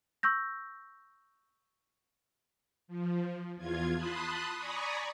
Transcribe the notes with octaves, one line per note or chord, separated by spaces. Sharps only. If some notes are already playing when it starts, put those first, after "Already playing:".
C#6 E6 G6 A#6
F3
E2 F4 G#6
A5 B5 C6 D#6 F#6
D5 G#5 A#5 B5 C#6 D#6